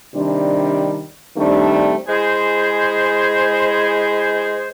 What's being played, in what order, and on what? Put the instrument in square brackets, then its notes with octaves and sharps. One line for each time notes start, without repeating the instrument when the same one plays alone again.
[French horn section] C3 D#3 G3 D4
D#3 G3 A3 C4 D4
[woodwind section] G#3 E4 G#4 C5